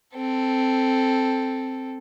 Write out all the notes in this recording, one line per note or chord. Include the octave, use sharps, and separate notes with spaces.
C4 A4